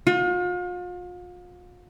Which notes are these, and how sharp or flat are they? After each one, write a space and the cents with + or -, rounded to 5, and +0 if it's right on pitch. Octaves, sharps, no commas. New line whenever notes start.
F4 +40